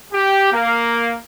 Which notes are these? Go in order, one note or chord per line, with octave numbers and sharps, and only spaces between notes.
G4
A#3